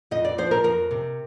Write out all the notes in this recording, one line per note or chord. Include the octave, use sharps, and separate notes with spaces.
F2 D#5
D5
F3 C5
A#4
F2 A#4
C3